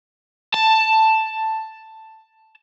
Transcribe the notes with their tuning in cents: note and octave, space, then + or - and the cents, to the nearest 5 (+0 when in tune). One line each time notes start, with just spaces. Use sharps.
A5 +5